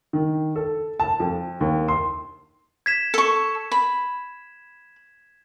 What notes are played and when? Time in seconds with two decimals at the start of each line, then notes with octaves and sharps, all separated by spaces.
0.13 D#3
0.56 A4
1.00 A5
1.20 F2
1.61 D#2
1.88 C6
2.86 G#6 B6 E7
3.14 A4 C#6
3.72 B5